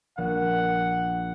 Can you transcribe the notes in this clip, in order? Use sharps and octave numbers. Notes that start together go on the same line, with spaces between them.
A#1 F#5